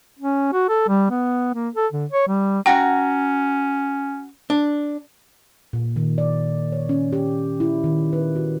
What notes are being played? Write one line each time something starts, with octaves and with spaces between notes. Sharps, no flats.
C#4
F#4
A4
G3
B3
A#3
A4
D3
C#5
G3
C#4 F#4 F#5 G5 A#5
D4
A#2
D#3
D5
C#5
C#4
G4
E4
D#3
B4
F#4